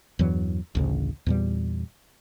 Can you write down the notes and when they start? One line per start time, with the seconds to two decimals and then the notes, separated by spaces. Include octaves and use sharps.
0.19 E2 G2 E3 F#3
0.75 A1 D2 C#3
1.26 E2 A#2 G3